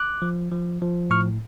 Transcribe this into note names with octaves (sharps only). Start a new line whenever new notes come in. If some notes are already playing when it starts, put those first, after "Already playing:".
Already playing: D6 F#6
F3
F3
F3
A2 C#6 F6